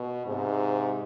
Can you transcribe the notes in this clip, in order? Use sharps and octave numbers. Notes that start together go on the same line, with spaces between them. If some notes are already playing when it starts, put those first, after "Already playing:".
Already playing: B2
G#2 C3